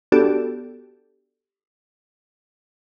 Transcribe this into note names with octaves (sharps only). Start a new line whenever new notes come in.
B3 D4 F#4 G4 A4 D5